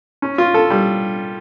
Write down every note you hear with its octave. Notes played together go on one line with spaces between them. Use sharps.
C#4
F4
A4
G3